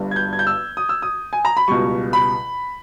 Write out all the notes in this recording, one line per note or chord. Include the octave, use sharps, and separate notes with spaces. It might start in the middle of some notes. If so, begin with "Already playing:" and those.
Already playing: G1 G2 G3
G#6
G6
G#6
G6
E6
D#6
E6
D#6
G#5
A#5
B5
C#2 B2 G3 C#6
B5